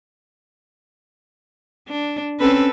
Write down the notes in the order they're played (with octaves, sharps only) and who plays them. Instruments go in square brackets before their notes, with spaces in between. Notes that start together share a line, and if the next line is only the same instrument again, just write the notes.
[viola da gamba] D4
[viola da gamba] C4 A4 B4 [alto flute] C#4